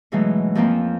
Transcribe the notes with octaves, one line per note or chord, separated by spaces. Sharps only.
G#2 B2 E3 F#3 G#3 A3
F2 F3 A#3 C4 C#4